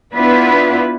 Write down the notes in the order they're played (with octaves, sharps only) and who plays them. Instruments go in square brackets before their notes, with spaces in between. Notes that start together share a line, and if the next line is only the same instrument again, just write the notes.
[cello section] B3 D4 E4 F4 B4